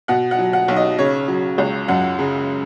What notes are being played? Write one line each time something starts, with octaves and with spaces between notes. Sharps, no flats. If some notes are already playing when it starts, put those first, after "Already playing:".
B2 F#5
F#5
F#3
F#5
B1
D#5
C#3 C#5
F#3
C#2
F#2 F#5
C#3